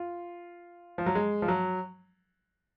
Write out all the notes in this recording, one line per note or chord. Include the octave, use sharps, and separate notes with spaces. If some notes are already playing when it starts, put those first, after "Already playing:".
Already playing: F4
F3
F#3
G#3
F3
F#3